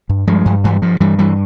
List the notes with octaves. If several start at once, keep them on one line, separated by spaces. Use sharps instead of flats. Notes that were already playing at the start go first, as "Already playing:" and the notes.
G2
G2 F3 G#3
G2
G2 E3 G3
G2 F3
G2 E3 G3
G2 E3 G3